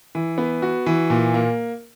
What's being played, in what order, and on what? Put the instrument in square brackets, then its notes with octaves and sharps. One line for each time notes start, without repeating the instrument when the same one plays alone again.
[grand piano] E3
B3
F#4
E3
A#2
A#3